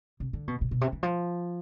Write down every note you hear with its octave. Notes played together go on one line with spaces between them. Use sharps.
C3
D3
B2
B2
B2
C3
E3
F3